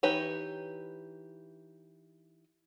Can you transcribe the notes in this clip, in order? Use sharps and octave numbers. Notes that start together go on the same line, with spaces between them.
E3 D#4 G4 B4 C#5